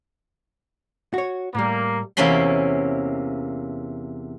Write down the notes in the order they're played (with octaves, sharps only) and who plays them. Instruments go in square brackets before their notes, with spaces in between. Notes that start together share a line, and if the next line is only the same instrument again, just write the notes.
[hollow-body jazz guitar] F#4 C#5
[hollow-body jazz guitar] A2 G3 [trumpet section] A#3
[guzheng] E2 C3 A#3 C#4 B5 C6